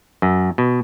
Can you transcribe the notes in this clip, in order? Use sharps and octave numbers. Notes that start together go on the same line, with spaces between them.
F#2
B2